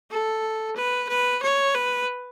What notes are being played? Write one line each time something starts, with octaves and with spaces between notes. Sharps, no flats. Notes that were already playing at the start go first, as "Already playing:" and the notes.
A4
B4
B4
C#5
B4